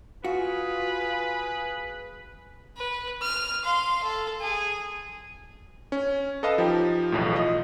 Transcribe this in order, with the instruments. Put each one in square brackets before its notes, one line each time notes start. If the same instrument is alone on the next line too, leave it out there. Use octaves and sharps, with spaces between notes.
[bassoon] F4 [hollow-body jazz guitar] F#4 [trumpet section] G#4 [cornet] B4
[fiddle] B4
F6
F5 C6
A4
G#4
[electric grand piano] C#4
A4 B4 D#5 F5 A5 D#6
F3 D#4 G4
B1 E2 A2
F4 D#5